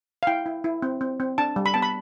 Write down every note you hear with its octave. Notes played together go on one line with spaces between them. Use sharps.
F5
E4 G5
E4
E4
C4
C4
C4
D4 A5
G3
B5
B3 A5
B5